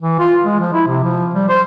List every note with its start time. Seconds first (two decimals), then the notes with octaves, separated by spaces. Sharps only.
0.01 E3
0.19 F4
0.44 G#3
0.60 F3
0.73 E4
0.87 C3
1.04 F3
1.34 G3
1.49 C5